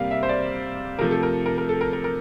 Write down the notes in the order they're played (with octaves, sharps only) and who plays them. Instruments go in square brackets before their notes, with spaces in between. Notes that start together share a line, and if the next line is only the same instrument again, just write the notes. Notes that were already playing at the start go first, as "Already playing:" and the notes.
Already playing: [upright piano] C3 G3 A#3 F5
E5
C5
D5
C3 F3 A3 A#4
A4
A#4
A#4
A#4
A4
A#4
A#4
A#4